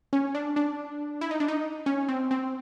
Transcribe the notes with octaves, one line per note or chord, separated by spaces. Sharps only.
C#4
D4
D4
E4
D#4
D4
D#4
C#4
C4
C4